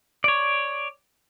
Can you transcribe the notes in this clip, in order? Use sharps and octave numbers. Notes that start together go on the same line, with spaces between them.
C#5 D5